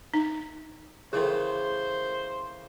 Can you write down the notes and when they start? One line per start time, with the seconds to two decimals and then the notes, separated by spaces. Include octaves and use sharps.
0.14 D#4
1.13 C#3 E3 A3 G#4 A#4 C5